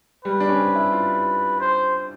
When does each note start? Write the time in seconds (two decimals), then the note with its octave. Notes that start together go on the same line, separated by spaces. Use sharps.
0.25 G3 B4
0.40 D4
0.49 C#4
0.59 C4
0.75 E4
0.92 F4
1.61 C5